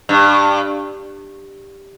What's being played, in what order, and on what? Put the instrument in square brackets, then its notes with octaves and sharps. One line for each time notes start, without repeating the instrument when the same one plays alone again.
[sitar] G2